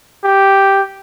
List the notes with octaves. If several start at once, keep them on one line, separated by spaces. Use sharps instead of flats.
G4